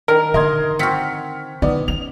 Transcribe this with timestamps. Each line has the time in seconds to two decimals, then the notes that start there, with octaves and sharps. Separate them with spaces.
0.08 D#3 A#4
0.34 D3 D#4 D#5 C6 G#6
0.79 C4 F#4 F6 B6 C#7
1.62 D3 B3 D#4 D5
1.88 C#4 F7